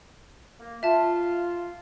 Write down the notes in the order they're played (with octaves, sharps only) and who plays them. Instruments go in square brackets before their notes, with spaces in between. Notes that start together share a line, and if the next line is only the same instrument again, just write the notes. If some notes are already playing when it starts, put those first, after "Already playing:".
[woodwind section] A#3
[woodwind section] F4 [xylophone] E5 A5